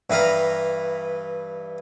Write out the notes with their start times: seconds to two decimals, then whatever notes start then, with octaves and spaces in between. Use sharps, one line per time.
0.10 G2 E3 B4 F5 A#5